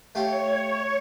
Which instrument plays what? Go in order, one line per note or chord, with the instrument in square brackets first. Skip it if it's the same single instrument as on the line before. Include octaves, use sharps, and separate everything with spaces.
[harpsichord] A3 F4 G4 [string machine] C#5